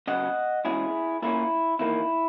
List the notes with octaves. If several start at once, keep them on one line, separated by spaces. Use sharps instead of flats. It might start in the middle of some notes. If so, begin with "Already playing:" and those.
C#3 F#3 B3 D#5 F#5
E2 B2 G#3 C#4 E4 G#4
A#2 A#3 C#4 E4
E2 D#3 A#3 E4